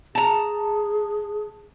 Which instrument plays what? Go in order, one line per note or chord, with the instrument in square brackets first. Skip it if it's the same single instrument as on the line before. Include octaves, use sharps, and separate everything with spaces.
[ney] G#4 [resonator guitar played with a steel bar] A5 A#5